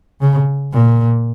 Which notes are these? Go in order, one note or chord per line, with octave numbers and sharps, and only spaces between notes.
C#3
A#2